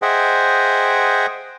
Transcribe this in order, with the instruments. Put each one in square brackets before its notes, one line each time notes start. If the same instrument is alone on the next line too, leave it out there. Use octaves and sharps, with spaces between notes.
[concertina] G#4 C5 D#5 E5 F#5 G5